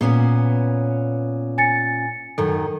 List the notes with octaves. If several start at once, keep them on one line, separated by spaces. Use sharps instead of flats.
A#2 B3 C#4
G#5 A6 C#7
F#2 D#3 A4